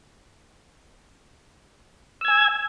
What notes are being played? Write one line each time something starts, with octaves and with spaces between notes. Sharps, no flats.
G#5 E6 G#6